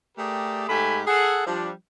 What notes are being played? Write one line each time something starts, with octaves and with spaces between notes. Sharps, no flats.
A3 G4 G#4 A#4 D5 G5
G#2 A3 G4 G#5 B5
G#4 A4 F#5
F3 G3 D4